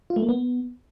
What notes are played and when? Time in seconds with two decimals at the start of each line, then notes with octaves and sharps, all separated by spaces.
0.10 F4
0.16 A3
0.23 A#3
0.29 B3